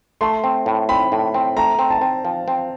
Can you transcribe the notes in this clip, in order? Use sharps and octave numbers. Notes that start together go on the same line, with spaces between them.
A3 C6
C4
A2
C4 B5
A2
C4
A3 A#5
C4
A5
C4
F3
C4